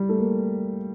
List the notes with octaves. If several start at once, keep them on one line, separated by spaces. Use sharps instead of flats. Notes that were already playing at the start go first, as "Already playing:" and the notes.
Already playing: G3
A3
A#3